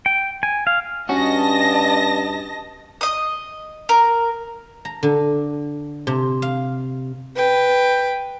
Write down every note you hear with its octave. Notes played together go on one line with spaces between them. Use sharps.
G5
G#5
F5
G2 C#4 F#4 D#5 A5 A#6
D#5 D#6
A#4
A#5
D3
C3
F5
B4 G5